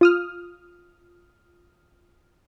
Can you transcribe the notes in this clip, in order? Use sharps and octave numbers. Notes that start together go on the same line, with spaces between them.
F4 D#6 F6